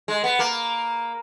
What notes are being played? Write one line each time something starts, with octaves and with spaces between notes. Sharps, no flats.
G#3
B3
A#3